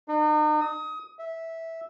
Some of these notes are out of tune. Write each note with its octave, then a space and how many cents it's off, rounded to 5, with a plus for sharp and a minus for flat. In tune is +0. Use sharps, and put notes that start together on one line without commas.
D#4 -40
D#6 +25
E5 -10